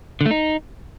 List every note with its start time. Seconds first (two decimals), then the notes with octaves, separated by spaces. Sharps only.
0.21 D3
0.26 A3
0.31 D#4